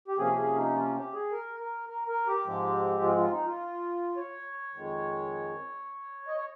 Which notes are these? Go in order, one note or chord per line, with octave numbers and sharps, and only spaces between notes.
G4
C3 F3 A#3 C#4 G#4
G#4
D#4
F4
G4
G#4
A#4
A#4
A#4
A#4
G4
G#2 F3 G#3 C4
F4
F4
D#4
F4
C#5
F2 D#3 G#3
D#5
C#5